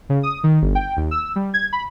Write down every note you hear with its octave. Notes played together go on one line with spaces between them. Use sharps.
C#3
D#6
D#3
G1
G5
D#2
E6
G3
G#6
B5